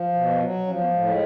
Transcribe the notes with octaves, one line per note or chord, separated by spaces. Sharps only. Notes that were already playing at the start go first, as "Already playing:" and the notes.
Already playing: F3
B2
F#3
F3 C#4
B3
A2 G#3
G#3